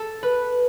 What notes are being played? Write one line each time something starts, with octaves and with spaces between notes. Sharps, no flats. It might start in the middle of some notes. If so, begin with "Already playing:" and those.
Already playing: A4
B4